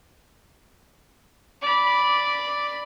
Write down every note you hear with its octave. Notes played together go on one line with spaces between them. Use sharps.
D5 B5